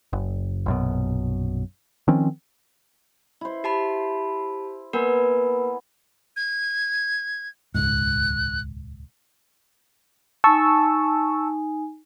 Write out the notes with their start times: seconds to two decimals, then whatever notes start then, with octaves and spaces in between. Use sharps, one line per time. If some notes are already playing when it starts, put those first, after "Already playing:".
0.13 F#1
0.66 A#1 F#2 B2
2.08 D#3 F3 C4 C#4
3.41 E4 C5
3.64 G4 A5 B5
4.93 A#3 B3 A#4 B4 G#5 C6
6.36 G#6
7.75 D#1 C#2 G#2 F#6
10.44 D#4 G#5 A5 C#6 E6